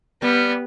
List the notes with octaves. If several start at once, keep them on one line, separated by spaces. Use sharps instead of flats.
G3 B3